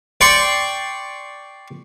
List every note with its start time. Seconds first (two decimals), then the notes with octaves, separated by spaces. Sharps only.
0.21 D5 G5 C6 C#6